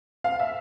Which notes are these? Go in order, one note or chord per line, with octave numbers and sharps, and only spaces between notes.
F5
E5